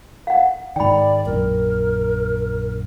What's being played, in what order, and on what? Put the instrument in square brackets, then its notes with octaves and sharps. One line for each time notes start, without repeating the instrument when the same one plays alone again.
[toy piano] F5 F#5
[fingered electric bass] G#2 D#3 [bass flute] D5 [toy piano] G5 B5
[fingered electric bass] A#1 F#2 [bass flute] A#4